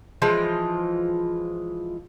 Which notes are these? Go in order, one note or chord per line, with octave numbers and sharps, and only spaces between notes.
E3 F3 G#3 F4